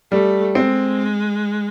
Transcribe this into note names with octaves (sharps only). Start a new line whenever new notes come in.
G3 A3
G#3 C4